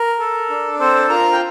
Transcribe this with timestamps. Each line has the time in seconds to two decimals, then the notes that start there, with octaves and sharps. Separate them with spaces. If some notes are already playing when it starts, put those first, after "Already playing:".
Already playing: A#4
0.19 A4
0.50 D4
0.79 C4 A4 C5
1.09 F4 A#4 A#5
1.32 G5